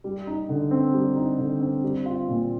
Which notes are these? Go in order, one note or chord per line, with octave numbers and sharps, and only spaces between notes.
G3
D#4
D3
C4
G3
D#4
D3
C4
G3
F4
A#2